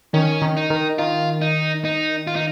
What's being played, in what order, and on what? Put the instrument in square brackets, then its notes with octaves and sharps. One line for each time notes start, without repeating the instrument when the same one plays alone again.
[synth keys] D#3 [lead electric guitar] C#4
[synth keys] D#3
[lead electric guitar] D#4
[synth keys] D#3
[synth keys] D#3 [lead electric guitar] F4
[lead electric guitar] D#4
D#4
F4
D#4